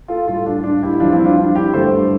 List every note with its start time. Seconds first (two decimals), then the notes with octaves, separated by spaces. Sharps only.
0.08 F4 A4
0.27 A2 G3 F4 A4
0.45 D4 F4
0.64 D4
0.83 E4 G4
0.93 E4
1.00 F2 E3 G3 D4 F4
1.13 C4 E4
1.24 D4 F4
1.38 D4 F4
1.55 E4 G4
1.74 G2 D3 A3 A4 C5